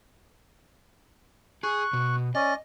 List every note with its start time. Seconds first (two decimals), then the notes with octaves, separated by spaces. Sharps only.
1.63 G#4 C#6 F#6
1.93 B2
2.35 C#4 D5 D#5